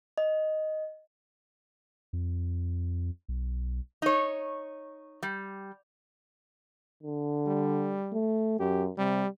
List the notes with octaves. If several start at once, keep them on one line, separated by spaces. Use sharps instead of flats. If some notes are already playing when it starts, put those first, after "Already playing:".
D#5
F2
B1
D#4 C#5
G3
D3
G3
A3
F#2 G4
C3 G3